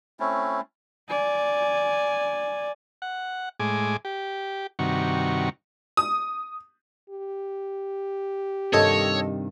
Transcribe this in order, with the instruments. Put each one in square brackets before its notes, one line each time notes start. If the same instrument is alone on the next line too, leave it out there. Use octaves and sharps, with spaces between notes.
[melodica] A3 C4 C#4 E4
[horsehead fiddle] D5 G#5
[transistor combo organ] F#5
A2 G#3 G#5 D6
G4
G2 C3 D#3 F#4 C#6
[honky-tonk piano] D#6
[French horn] G4
[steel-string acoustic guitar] G2 C3 D#3 [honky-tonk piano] A4 D#5 [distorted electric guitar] C#5